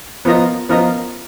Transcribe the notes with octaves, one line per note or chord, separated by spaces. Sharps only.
F3 B3 F4 A#4 D#5
F3 B3 F4 A#4 D#5